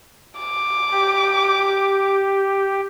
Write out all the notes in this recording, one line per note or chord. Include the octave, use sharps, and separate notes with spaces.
D6
G4